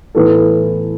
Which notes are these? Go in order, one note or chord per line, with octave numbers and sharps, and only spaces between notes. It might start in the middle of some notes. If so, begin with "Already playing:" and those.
A2 E3 B3 A4